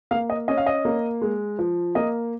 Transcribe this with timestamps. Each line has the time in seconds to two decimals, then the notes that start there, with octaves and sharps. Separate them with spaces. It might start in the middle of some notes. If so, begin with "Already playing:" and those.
0.11 A#3 F5
0.30 D#5
0.48 C#4 D#5
0.57 F5
0.66 D#5
0.85 A#3
1.22 G#3
1.59 F3
1.95 A#3 D#5